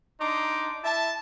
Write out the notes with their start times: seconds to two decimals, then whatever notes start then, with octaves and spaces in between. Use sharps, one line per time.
0.20 D4 D#4 C6 D6
0.84 E4 E5 A5